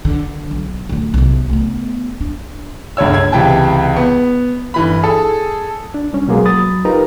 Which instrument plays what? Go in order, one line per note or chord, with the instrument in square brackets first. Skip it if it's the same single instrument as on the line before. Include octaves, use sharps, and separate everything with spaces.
[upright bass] D3
B1
D1 D3
B1 C3
A3 B3
D4
[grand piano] G1 C#2 D3 C#5 E6
G#6
C#2 C3 E3 G5 A5
B3
G1 E3 B5
G#4 A4
[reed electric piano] D4
C2 G3 C#4
B2 F#3 G#3 A#3 B3 G#4
F#3 B5 D#6 A6
D#4 F4 G4 A#4 B4 A#5